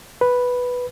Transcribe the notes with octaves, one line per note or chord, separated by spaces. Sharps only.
B4